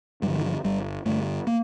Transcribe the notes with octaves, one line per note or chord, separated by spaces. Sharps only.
G2 D3 F3 G3
D#3
F3
G1 G3
G2 D3 A3
A#3